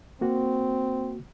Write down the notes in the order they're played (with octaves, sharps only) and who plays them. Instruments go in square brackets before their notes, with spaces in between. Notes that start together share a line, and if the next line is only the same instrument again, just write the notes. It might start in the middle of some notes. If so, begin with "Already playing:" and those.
[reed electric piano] A#3 F#4 [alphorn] C4